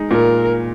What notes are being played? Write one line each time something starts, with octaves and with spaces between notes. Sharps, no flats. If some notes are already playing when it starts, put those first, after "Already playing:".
Already playing: G#3 D#4
A#2 A#4